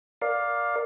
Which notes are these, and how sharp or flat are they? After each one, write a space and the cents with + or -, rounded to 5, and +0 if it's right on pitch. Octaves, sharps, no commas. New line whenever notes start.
A#4 +0 D5 +0 F5 +15